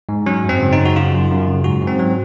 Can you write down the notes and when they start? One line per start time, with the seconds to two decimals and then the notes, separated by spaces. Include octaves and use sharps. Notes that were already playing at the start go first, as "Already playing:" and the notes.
0.09 G#2
0.26 F#3 C#4
0.44 F#2 C4
0.61 C#3
0.73 D#4
0.78 F#2
0.85 F#4
0.96 C#3 F4
1.13 F#2
1.30 F#2
1.47 C#3
1.64 G#2 F#4
1.82 G#2
1.87 C4
1.99 F#3